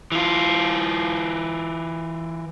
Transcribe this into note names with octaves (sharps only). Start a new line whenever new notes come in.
E3 F4